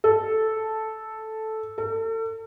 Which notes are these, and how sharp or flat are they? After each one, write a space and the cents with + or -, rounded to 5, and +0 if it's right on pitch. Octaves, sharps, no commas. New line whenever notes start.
A4 -5
A4 +35